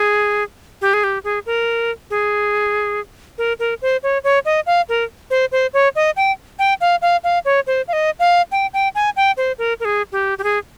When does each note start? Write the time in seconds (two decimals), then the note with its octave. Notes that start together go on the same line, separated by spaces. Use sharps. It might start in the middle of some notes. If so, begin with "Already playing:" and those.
Already playing: G#4
0.81 G4
0.94 G#4
1.04 G4
1.24 G#4
1.46 A#4
2.10 G#4
3.38 A#4
3.59 A#4
3.82 C5
4.03 C#5
4.24 C#5
4.45 D#5
4.66 F5
4.89 A#4
5.30 C5
5.52 C5
5.74 C#5
5.96 D#5
6.17 G5
6.59 G5
6.81 F5
7.02 F5
7.24 F5
7.45 C#5
7.67 C5
7.88 F5
7.93 D#5
8.20 F5
8.52 G5
8.74 G5
8.95 G#5
9.16 G5
9.37 C5
9.58 A#4
9.80 A#4
9.85 G#4
10.12 G4
10.38 G4
10.44 G#4